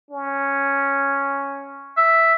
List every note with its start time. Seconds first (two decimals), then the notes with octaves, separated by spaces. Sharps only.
0.11 C#4
1.97 E5